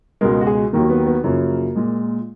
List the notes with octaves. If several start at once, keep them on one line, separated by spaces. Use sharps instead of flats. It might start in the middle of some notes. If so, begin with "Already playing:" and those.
C#2 B2 G#3 A#4
F#4
G#4
D#2 D#3 F#3 A#3
B3
B3
F#2 C#3 F3 A#3
A#2 G#3